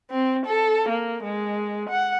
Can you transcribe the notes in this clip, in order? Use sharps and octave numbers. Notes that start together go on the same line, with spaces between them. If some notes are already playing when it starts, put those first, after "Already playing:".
C4
A4
A#3
G#3
F#5